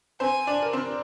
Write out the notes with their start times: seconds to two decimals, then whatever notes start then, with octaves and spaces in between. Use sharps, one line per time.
0.20 C4 C5 G#5
0.47 D4 D5
0.62 A#4
0.73 C4 C5